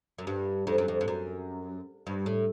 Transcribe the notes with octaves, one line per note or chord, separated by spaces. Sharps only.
F#2
G2
F2
F#2
F2
G2
F#2
G2
A2